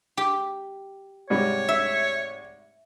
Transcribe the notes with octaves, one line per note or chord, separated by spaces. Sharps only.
G4
G#2 C3 G3 C#5
E5